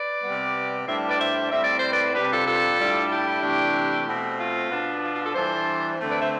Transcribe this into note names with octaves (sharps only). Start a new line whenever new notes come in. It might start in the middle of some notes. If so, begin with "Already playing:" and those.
Already playing: B4 D5
C3 G3 B3
A2 G3 D4 C5 E5
B4 D5
C5 E5
A2 G3 C4 E5
D5
C5
B4 D5
C3 G3 D4 G4 B4
F4 A4
F4 A4
A2 G3 D4
E4 G4
C3 E3 A3 D4
B2 A3 C4
F4
B2 B3 D4
F4
F4
F4 A4
E3 G3 D4 A4 C5
D3 A3 C4
B4 D5
C5 E5